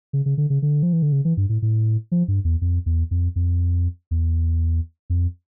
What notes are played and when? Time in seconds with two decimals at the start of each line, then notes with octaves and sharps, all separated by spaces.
0.13 C#3
0.26 C#3
0.38 D3
0.50 C#3
0.62 D3
0.83 F3
0.93 E3
1.02 D3
1.12 C#3
1.25 E3
1.37 G2
1.49 A2
1.62 A2
2.12 F3
2.28 G2
2.45 E2
2.61 F2
2.86 E2
3.11 F2
3.36 F2
4.11 E2
5.10 F2